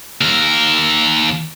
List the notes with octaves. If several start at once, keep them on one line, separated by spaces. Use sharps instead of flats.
D#2 A#4